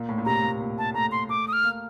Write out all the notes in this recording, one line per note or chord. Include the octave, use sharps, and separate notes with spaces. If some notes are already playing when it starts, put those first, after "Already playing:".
Already playing: A#2
A2
A#2
C3 A#5
A#2
A#2
A5
A3 A#5
C6
A3 D6
D#6
F6
A#3